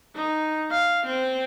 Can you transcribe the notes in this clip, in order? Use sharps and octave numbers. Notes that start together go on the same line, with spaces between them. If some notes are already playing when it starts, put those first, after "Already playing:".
D#4
F5
C4